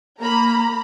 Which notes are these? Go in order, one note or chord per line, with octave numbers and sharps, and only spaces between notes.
A#3 A#5 B5